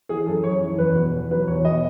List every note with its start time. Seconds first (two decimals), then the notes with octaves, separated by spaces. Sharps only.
0.09 E3 G#4
0.26 F#2 A4
0.44 F#2 C#5
0.62 E3
0.78 E2 B4
0.95 B2
1.14 E2
1.31 F#3 B4
1.47 E2 C#5
1.64 B2 D#5